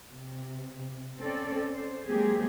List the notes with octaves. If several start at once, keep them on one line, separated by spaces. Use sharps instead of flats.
C3
C4 C#4 A4 D5
C5
F#3 G#3 A#3 C4 G4 G#4